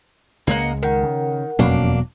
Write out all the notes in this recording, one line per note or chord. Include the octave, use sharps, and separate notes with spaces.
C#2 G#3 A#3 D#5 F#5
D#3 A#4 F#5
C#3
E1 F2 B2 F#3 A#3 C#4 D4